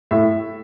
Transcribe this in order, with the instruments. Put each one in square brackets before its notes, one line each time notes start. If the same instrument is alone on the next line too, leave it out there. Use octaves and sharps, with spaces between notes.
[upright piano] A2 E5